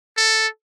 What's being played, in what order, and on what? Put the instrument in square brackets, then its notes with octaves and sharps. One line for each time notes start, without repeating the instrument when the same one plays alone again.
[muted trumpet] A4